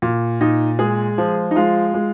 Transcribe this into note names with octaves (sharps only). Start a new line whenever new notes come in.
A#2
A#2 D#4
G#3 G#4
F3
D#4
G#3 F4
G#3